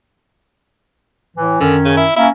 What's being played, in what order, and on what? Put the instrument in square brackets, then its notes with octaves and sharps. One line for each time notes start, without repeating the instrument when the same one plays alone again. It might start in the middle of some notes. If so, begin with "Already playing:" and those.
[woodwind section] A2 E3
[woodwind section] F#2 D#3 C#4 [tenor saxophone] D3
[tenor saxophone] C#3
E4
[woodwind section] A#3 C#4 [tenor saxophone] E4